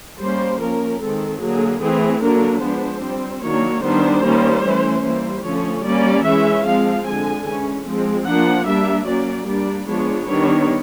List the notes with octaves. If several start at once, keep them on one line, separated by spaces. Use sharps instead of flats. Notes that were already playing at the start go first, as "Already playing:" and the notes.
G3 A#3 C#4 C5
F3 A#3 C#4 A#4
D#3 G#3 C4 A4
D3 F#3 A#3 G#4
E3 A3 C4 G#4
D3 F#3 A#3 D4 A#4
F3 G#3 B3 D4 C5
G3 C4
D#3 F#3 A#3 D4 C#5
D#3 G3 B3 D4 C5
D#3 G3 A#3 C#4
E3 A3 C#4
E3 G3 A#3 C5
D3 F3 A3 C#4 C#5
G3 A#3 C#4 D5
E3 G#3 C#4 E5
F3 G#3 C4 F5
D3 F3 G#3 G#5
E3 G#3 C#4
F3 G#3 C4
F3 A#3 D4 F#5
G3 A#3 D4 E5
F#3 A#3 C#4 D5
G3 A#3 D4 D5
F3 G#3 B3 D4 C#5
D#3 G3 B3 D4 C#5